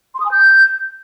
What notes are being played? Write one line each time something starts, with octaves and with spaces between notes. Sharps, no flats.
C6
D#6
G#5
G6